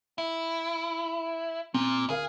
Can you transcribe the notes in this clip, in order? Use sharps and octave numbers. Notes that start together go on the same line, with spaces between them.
E4
A#2 C4
D2 G#4 A#4 F5